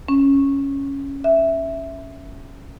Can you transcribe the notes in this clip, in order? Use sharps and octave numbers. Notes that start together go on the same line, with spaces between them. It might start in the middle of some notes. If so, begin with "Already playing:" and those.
C#4
E5